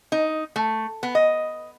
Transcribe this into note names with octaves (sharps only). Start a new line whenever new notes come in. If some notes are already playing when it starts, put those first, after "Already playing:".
D#4
A3
B3
D#5